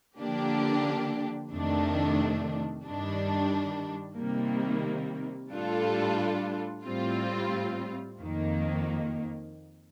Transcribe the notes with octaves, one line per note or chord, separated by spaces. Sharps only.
D3 F3 A#3 D4 G4
F2 C3 D#3 A3 D4
G2 D#3 G3 D4
C3 D#3 G3 A#3
A2 G3 D4 F4 A4
A2 G3 C4 F4
F2 D#3 A#3